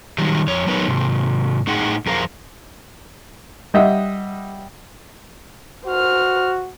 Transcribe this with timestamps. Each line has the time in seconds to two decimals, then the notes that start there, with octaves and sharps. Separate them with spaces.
0.18 D#3 F#3 G3
0.47 F2 C#5
0.67 F#3 B3 D#4 A#4 B4 C#5
0.88 G#2 C3
1.67 A2 D#4 G#4 F#5 G5
2.06 F2 G#4 A#4 C5 F5
3.74 G3 D#5 E5 F#5
5.86 F#4 C5 F6